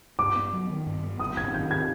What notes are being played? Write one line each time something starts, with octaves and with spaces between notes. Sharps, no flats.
G2 D6
B3
F#3
D#3
G2
B3
F#1 D#6
F#1 G#6
D#3 G6
G#6